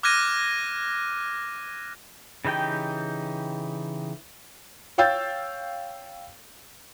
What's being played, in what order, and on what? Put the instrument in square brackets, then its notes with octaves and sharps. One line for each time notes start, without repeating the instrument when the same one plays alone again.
[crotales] D6 F6 F#6 G#6 A#6 D#7
[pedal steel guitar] C#3 E3 D#4 G4 G5
[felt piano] C#5 F5 G5 E6 G6 A6